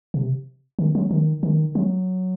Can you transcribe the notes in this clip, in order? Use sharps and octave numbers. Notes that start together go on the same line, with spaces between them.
C3
D#3
F#3
D#3
D#3
F#3